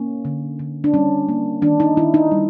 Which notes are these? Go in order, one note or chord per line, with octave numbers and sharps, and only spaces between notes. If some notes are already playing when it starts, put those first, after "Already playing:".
Already playing: A#3 C#4
D3
D3
D4
G3 C#4
A#3
D#3 D4
D#4
D#3 E4
D#4
G3